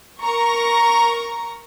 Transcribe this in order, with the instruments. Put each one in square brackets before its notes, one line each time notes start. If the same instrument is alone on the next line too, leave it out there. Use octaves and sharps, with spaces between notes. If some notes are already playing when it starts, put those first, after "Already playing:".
[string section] A#4 A#5 C#6